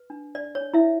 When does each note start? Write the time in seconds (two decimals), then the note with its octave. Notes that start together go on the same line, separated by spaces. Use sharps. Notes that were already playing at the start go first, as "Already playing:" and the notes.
Already playing: B4
0.10 D4
0.35 D4 D5
0.55 C#5
0.61 D4
0.74 E4 E5